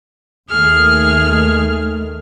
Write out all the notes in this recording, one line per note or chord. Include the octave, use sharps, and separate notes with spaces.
D#2 D#3 A3 G#4 F6